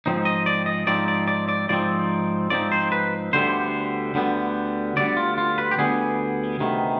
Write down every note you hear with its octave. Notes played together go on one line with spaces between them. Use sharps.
G#2 F3 C4 D#4
D#5
D5
D#5
G#2 F3 C4 D#4 D5
D5
D5
D5
G#2 F3 C4 D#4 D5
G#2 F3 C4 D#4 D5
C5
B4
D2 D3 G3 B3 C5
D2 D3 G3 B3
D2 D3 G3 B3 D5
F4
F4
B4
G4
D2 D3 G3 B3 G#4
D2 C3 D#3 B3